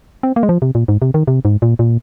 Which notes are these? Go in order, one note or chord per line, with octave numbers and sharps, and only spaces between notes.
C4
A#3
G#3
F3
C3
A#2
G#2
C3
D#3
C3
G#2
A#2
A#2